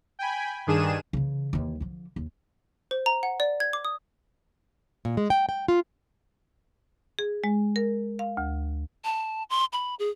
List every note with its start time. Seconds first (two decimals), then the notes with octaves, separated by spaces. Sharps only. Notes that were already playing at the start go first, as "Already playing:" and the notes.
0.19 G5 G#5 B5
0.67 G2 D#3 D4 G#4 D#7 E7
1.13 C#3 E3
1.53 D#2 E3
1.80 D3 F3
2.16 D#2
2.91 C5
3.06 A#5
3.23 F#5
3.40 D5
3.60 G#6
3.73 D6
3.85 D#6
5.05 A#2
5.17 G#3
5.30 G5
5.49 G5
5.68 F4
7.19 G#4
7.44 G#3
7.76 A#4
8.19 F5
8.37 D2
9.05 A5
9.50 C6
9.73 B5
9.99 G#4